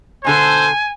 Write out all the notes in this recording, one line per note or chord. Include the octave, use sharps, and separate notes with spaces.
B2 D3 A4 C5 G#5